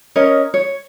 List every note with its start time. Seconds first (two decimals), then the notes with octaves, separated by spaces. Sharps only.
0.16 C#4 A#4 C#5 D#5
0.54 C#5